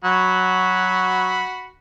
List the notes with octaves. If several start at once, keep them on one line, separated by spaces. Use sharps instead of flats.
F#3 F#4 B5